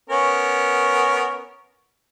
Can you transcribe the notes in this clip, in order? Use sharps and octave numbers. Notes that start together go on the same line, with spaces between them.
B3 C#4 A#4